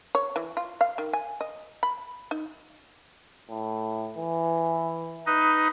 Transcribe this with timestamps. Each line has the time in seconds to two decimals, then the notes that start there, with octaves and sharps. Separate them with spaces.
0.15 C#5
0.36 E3
0.57 F4
0.81 F5
0.98 D#3
1.13 G#5
1.41 D#5
1.83 B5
2.31 D#4
3.50 A2
4.18 E3
5.26 D#4 B4 D#5